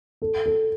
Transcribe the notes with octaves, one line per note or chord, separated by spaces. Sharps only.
A4
A4